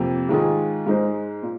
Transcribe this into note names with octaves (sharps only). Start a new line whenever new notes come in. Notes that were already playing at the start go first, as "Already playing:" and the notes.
Already playing: F2 C3 F3 A#3
G#2 D#3 G#3 F4 G#4
G#2 G#3 D#4 C5
A#2